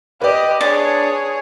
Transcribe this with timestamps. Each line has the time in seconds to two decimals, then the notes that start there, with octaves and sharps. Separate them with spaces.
0.22 G4 B4 D5 D#5
0.61 D4 G#4 C#5